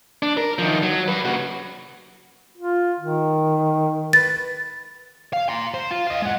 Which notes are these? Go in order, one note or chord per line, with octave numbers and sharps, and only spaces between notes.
D4
A#4
D#3 F3
F#3
G3 B4
C#3 F#4
F4
D#3
B4 A6
F5
A#5 C6
C5
F4
D#5 F5
G#3 F#5